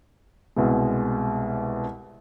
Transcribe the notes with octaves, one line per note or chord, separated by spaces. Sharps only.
C2 B2 G#3